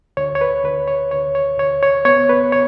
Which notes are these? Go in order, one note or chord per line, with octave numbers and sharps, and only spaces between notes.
D2 C#5
C#5
B4
D2 B4
C#5
D2 C#5
C#5
D2 C#5
C#5
B3 C#5
B4
C#5